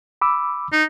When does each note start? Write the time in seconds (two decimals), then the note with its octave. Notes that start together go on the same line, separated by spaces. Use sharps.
0.21 B5 D6 E6
0.72 D#4